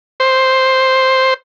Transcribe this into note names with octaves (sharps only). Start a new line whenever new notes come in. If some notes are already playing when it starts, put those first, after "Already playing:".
C5